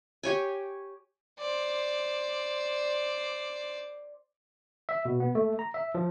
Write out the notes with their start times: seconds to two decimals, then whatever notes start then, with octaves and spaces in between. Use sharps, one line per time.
0.23 G4 C#5 G#5
1.39 C5 D5
4.89 E5
5.05 B2
5.20 B3
5.35 A3
5.59 A#5
5.74 E5
5.95 F3